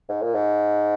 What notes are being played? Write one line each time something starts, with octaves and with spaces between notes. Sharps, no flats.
G#2
A#2
G#2